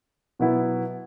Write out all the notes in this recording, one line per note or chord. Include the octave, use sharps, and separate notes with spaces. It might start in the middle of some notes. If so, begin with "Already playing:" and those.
B2 F#3 B3 E4